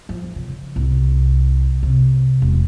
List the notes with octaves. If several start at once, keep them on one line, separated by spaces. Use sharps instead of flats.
F3
C#3
C2
C3
E1